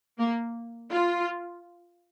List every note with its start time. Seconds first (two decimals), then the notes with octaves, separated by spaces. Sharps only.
0.19 A#3
0.91 F4